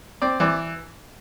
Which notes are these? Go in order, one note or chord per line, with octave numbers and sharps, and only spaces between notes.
C4 D5
E3 D5